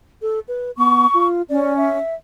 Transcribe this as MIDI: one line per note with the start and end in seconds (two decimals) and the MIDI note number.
0.22 0.39 69
0.48 0.71 71
0.77 1.06 59
0.77 1.26 85
1.14 1.42 65
1.49 1.97 61
1.49 1.77 74
1.77 2.15 76